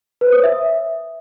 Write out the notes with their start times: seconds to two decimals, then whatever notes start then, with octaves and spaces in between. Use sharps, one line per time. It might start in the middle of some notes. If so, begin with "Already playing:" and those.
0.21 B4
0.27 C5
0.32 D#6
0.38 C#5
0.44 E5